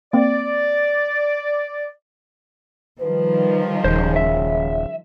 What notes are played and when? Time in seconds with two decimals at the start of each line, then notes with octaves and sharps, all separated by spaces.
0.13 A#3 C4 D5
3.01 D#3 F3 G3 B4
3.84 D#1 C#3 C5
4.16 E5